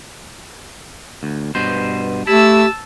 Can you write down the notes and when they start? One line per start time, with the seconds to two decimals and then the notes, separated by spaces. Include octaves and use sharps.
1.23 D2
1.55 G2 B2 C5
2.27 A3 E4 G4 A5 E6